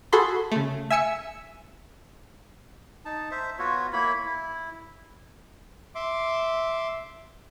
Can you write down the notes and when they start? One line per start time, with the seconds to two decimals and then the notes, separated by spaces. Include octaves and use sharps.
0.13 F#4 G#4 A4 B5 C6
0.52 C#3 A3
0.90 E5 G#5 E6 C#7
3.05 D#4 A5
3.31 C5 E5
3.59 B3 F4 F#4 C#5
3.93 A#3 E4 C#5 B5
4.25 E4
5.95 E5 C6 D6